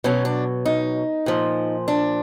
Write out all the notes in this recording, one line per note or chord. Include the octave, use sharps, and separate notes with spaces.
B2 F#3 C#4
D4
D#4
A#2 F3
D4